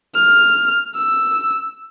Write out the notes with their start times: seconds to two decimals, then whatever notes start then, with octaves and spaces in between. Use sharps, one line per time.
0.14 F6
0.96 E6